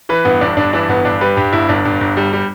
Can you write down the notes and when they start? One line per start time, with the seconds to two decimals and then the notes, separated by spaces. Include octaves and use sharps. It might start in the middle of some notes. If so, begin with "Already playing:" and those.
0.09 E3 B4
0.25 G2 B3
0.41 G1 D4
0.57 G2 D4
0.73 E3 D4
0.89 G1 B3
1.05 G2 D4
1.21 G3 B4
1.37 G2 G4
1.53 G1 E4
1.69 G1 D4
1.85 G2
2.01 G1
2.17 G3
2.33 G3